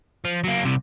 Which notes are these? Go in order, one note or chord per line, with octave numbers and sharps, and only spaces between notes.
F3
F#3 A#3
C2 C3